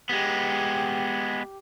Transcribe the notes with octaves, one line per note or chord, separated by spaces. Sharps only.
G#3 B3 G4